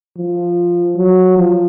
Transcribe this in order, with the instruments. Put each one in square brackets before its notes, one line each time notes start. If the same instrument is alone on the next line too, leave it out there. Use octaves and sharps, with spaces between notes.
[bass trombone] F3
F#3
F3